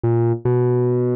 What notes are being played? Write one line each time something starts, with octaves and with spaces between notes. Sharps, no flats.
A#2
B2